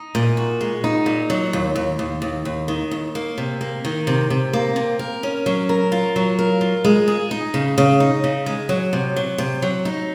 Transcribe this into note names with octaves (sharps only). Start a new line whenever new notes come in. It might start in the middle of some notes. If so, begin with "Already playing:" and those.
Already playing: D#4
A#2
F#4
G#3
D#4
A#2
F#3
D#2
D#2
D#2
D#2
D#2
D#3
D#2
A#3
C3
A#3
D#3
C3
C3
A#3
C3
A#4
C#4
F#3
A#4
F4
F#3
A#4
F4
G#3
G#4
D#4
C#3
C#3
D#4
C#3
G#3
F#3
C3
F#3
C3
F#3
D#4